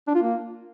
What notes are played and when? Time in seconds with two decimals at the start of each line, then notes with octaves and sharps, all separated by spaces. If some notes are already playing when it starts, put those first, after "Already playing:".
0.07 D4
0.15 F4
0.22 A#3